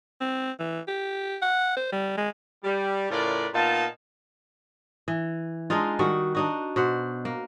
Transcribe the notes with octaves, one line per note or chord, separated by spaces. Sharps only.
C4
E3
G4
F#5
C5
G3
G#3
G3
A2 C#3 F4 A#4 B4 D5
A#2 B3 D#4 F5 A5
E3
G#3 D4 D#4 F4
D#3 G3 F#4 F#5
D4 D#4 F#4
B2 C5 F#5
A#3